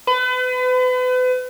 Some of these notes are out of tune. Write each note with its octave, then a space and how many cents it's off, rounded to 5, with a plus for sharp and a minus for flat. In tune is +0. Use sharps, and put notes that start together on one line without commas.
B4 +35